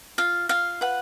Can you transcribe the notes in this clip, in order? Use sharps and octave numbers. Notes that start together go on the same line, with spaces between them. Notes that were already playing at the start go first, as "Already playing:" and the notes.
F4 F5
F4 F5
B4 F#5